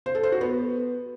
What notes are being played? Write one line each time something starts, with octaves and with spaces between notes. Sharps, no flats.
C5
A4
C5
F#4
B3